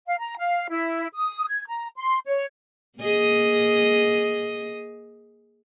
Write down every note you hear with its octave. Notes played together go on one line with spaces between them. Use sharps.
F5
A#5
F5
E4
D#6
G#6
A#5
C6
C#5
A#3 G#4 D#5